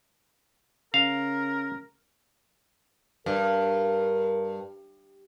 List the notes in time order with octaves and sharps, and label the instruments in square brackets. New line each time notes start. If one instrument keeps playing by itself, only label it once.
[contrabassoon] C#3 [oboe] A#4 [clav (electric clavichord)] F5
[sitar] G2 [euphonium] A#4